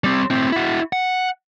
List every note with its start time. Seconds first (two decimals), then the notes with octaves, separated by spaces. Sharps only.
0.04 G3 C4
0.30 A2 C4
0.52 E4 F#4
0.93 F#5